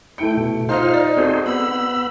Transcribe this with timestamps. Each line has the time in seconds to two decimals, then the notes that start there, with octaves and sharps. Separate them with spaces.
0.18 A3 E4 G5 C#7
0.37 B2
0.69 D#4 F4 C5 F5 F6
0.94 D5
1.17 C4 F#4 G#4 A4 C5
1.46 B3 B5 E6